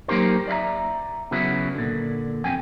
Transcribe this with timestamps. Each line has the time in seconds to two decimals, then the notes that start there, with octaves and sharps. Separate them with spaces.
0.08 F#3 A#3 D#4 G4 A#4 C5
0.48 D5 E5 F5 A#5
1.31 C#3 F#3 B3 E4 F#4
1.75 A#2 D3
2.44 F2 D3 G5 G#5